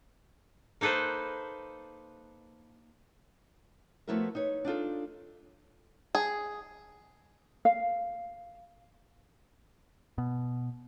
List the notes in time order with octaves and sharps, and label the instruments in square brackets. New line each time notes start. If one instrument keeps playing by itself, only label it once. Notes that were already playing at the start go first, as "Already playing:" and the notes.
[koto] A#3 D#4 A4 B4 C5
[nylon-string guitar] F3 A3 B3 E4 F#4 A#4
D#4 B4 C#5
D4 D#4 F4 A4
[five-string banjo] G#4
[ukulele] F5
[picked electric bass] B2